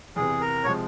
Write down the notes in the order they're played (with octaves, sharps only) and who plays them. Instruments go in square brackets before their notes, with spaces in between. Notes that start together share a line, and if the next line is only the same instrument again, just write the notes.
[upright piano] E2 C3 E3 [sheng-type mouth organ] G#4
[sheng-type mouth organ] A#4
[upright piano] C3 F3 G#3 [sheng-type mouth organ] C#5